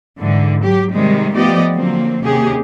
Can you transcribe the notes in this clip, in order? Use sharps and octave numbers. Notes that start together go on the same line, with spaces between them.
G#2 D3 E3
F#3 G4
C3 D#3 G3 G#3
F3 A3 B3 G4 D5 D#5
D3 F3 F#3 A#3 C4
D#2 C3 A#3 C#4 G4 G#4